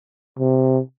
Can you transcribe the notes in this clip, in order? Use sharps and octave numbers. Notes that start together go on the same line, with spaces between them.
C3